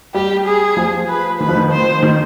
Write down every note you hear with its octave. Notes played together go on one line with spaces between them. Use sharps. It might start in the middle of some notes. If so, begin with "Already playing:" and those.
G3 G4
G#4
F3
B4
D#3 B4
F3
D#3
C5
D#3